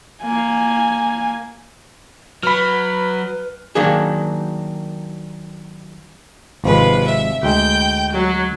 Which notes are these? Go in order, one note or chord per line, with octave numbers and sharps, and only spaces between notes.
A#3 G#5
F#3 B4 B5 F6
D#3 F#3 A#3 D4 G#4
G#1 C3 F3 G#3 B4
E5
D2 G#3 G5 G6
F#3